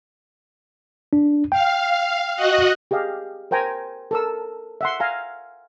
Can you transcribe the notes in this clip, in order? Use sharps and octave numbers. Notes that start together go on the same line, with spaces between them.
D4
F5 G5
F#4 D#5 F#5
G4 G#4 D#5 F5
A#4 C5 G5 G#5 A#5
A4 A#4 E6
E5 F#5 C6
F5 G#5 A#5